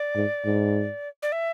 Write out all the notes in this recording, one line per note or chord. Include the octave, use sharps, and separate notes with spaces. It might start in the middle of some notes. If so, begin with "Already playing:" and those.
Already playing: D5
G#2
G#2
D5
E5